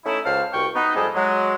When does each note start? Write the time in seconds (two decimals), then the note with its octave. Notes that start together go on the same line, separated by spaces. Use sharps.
0.05 A3 C#4 D#4 E4
0.24 C#2 C5 F5 A5 F6
0.53 C2 B2 G5 C#6
0.75 B3 D#4
0.95 F2 G#2 G3 G#4 A4 D#5
1.15 F#3 G#3